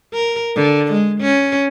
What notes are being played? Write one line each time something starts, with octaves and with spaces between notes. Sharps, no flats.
A#4
D3
G#3
C#4